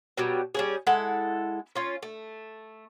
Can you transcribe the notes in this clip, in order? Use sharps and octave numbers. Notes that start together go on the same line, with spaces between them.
B2 F#3 G3
G3 C#4 G#4
G#3 E4 A4 F#5
C#4 F4
A3